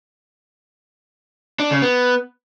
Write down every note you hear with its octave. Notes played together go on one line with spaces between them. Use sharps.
D4
C#3
B3